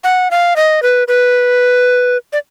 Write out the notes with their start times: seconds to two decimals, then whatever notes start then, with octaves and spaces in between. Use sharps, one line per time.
0.04 F#5
0.31 F5
0.56 D#5
0.83 B4
1.08 B4
2.33 D5